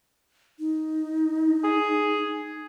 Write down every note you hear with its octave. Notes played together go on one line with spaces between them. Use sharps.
D#4
G#4